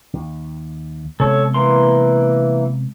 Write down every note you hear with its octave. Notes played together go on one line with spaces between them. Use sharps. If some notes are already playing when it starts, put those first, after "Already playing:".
D#2
C3 G#3 B3 A4 C#5
E3 A#3 C6